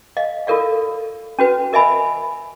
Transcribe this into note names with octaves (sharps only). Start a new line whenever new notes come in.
D#5 F5
F4 A4 A#4 D5 F5
C#4 F#4 B4
A#4 D#5 E5 G#5 B5